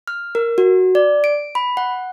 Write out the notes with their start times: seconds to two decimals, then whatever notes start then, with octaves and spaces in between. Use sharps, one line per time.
0.08 F6
0.35 A#4
0.58 F#4
0.95 D5
1.24 D7
1.55 B5
1.77 F#5